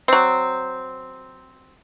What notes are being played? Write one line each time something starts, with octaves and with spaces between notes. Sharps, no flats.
F#3 C4